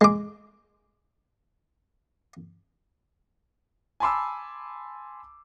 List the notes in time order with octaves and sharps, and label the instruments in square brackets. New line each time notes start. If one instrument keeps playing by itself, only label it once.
[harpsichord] G#3 D6
[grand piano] G#5 A5 B5 C6 D6 E6